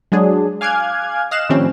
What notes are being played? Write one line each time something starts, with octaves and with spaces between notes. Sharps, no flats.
F#3 G#3 D4 G#4
F5 G#5 D6 F6 F#6 G#6
D#5 F5 F#6 E7
A2 D#3 F3 G3 C4 C#4